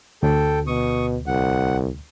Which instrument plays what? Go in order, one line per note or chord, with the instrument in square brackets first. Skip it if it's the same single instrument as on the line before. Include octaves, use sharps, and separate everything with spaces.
[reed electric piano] D2 [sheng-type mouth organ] A4 G5
[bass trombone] B2 [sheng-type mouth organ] C#6 D#6
[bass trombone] C2 [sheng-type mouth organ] F#5